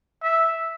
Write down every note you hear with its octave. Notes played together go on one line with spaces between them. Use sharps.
E5